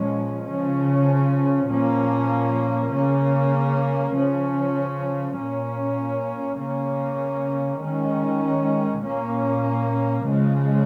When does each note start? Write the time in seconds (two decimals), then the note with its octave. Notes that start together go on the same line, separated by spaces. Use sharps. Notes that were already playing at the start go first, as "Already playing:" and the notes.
Already playing: A#2 F3 G#3 C#4
0.47 C#3 F3 C#4
1.69 A#2 F3 A#3 C#4
2.93 C#3 A#3 C#4
4.14 C#3 F3 C#4
5.37 A#2 A#3 C#4
6.59 C#3 A#3 C#4
7.81 D#3 G#3 C#4
9.03 A#2 A#3 C#4
10.25 C#3 F3 G#3